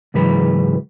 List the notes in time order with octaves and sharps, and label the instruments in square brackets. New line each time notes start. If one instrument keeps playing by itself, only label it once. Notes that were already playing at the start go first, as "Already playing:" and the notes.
[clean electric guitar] C#2 G#2 E3 F#3 B4